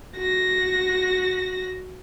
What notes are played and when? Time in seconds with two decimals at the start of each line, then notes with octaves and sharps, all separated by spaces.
0.16 F#4 A#6